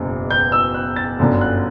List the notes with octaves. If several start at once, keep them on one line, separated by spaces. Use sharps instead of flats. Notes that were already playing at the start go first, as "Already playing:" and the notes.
Already playing: F#1 E2 B2
G6
E6
F#6
A6
G1 F#2 D3
F#6